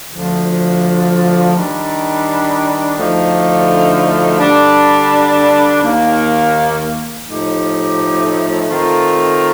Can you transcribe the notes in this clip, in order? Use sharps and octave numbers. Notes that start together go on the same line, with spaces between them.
D2 D3 F3
D#3 G3 D4
D2 D3 F3 A3 D#4
D3 G3 D4
D#2 D#3 A#3
A2 F3 A3 D#4 G4
D#3 A3 C4 F4 A#4